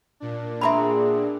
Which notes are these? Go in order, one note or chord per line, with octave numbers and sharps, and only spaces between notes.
A#2 D4
B3 C4 G#4 E5 A#5 B5